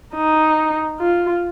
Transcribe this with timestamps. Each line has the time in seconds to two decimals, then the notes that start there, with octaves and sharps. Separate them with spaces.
0.15 D#4
1.00 F4